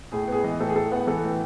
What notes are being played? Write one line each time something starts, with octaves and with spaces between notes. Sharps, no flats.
A2 G#4
B3 G#4
E3 D#5
A2 A4
G#4
A2 A4
B3 F#5
E3 A4
A2